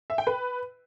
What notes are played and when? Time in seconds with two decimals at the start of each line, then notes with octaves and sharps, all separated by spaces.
0.10 E5
0.18 G5
0.27 B4